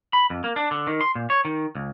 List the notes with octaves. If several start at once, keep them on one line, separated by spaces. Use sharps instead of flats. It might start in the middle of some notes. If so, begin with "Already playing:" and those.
B5
F2
A#3
D4
D3
D#3
C6
A#2
C#5
D#3
C#2